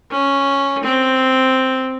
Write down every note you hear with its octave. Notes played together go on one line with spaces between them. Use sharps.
C#4
C4